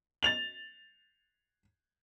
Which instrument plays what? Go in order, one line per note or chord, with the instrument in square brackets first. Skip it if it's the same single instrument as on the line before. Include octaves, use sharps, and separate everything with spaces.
[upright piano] A6 F7 F#7